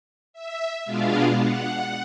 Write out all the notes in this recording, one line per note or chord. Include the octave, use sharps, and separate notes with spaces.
E5
B2 G#3 B3 D4 F4 F5
F#5